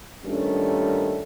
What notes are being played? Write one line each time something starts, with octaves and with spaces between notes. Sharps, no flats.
G2 A#2 D#3 G3 A3 C#4